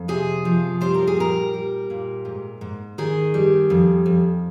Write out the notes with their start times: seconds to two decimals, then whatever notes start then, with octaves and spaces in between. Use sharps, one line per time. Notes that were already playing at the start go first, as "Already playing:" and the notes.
Already playing: F2
0.08 C3 G#4
0.45 F3
0.81 G3 C5
0.94 A#4
1.07 G#4
1.17 A#2 A#4
1.54 G3
1.90 A#2
2.25 G#2
2.61 G#2
2.98 D#3 G#4
3.34 G3
3.70 F2
4.06 F2